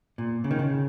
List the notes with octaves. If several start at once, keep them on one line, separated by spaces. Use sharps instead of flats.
A#2
C#3
D#3
C#3